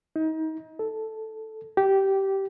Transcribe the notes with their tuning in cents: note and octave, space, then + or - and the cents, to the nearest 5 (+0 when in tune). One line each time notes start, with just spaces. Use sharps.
D#4 +30
A4 -5
G4 -15